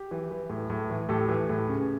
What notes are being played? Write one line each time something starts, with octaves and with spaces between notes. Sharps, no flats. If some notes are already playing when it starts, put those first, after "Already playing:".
Already playing: G4
E3
E3
A2
A2
E3
A2 G4 A4
E3
A2
C#3